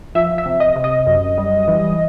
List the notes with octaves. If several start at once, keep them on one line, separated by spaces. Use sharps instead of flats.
F3 E5
E5
C3
D#5
C3
D#5
F#2
G3
E3